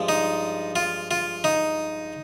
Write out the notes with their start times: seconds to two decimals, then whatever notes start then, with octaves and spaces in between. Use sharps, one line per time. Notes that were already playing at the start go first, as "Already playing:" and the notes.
Already playing: G2 F3 G#3
0.09 D#4
0.76 F4
1.11 F4
1.44 D#4